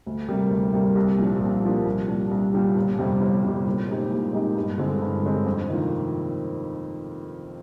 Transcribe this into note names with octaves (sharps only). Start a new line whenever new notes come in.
D2
C3 G3 A#3
D2
C3 G3 A#3
C2
A#2 F3 A#3 D4
C2
A#2 F3 A#3 D4
C2
A#2 G3 D4
C2
A#2 G3 D4
G1
F2 C3 G3
G1
F2 C3 G3
A#2
G#3 C4 D#4 G4
A#2
G#3 C4 D#4 G4
G2
D3 G#3 C4
G2
D3 G#3 C4
F2
C3 D#3 A#3 F4